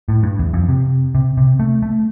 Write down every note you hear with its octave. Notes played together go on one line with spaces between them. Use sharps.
A2
G2
E2
F2
C3
C3
C3
A3
A3